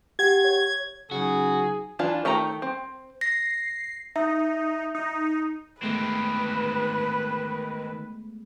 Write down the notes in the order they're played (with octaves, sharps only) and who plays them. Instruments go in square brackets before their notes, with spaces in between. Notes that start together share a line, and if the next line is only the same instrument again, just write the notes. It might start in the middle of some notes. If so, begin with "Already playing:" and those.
[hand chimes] G4 F#5 [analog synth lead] G#6
[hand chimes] C#5
[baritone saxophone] C#3 [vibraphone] F#3 D#4 [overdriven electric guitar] F#4 [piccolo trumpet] G#4
[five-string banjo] E3 D4 F4
D#3 A3 G5 A#5
C4
[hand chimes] A#6 [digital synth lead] C7
[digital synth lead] D#4 [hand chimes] E5
[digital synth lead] D#4
[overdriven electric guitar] D#3 C4 [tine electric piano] G#3 A3 B3 [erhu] B4